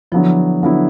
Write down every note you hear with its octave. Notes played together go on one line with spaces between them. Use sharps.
D3 F3 F#3 B3 E4
D3 F#3 B3 E4